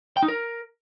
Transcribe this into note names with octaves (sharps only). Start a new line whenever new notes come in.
G5
D#4
A#4